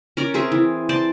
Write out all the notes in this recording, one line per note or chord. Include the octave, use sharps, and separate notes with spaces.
C#4 A#4 D5
C4 G#4 E5
E3
C5 D5 A5